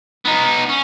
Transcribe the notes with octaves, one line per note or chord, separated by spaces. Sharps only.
B3 D#4
C#4